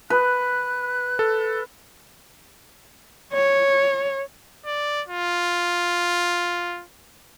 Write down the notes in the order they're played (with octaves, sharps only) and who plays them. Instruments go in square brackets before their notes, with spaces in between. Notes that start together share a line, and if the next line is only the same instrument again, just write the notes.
[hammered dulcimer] B4 [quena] F#6
[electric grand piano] A4
[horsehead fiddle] C#5
[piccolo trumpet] D5
F4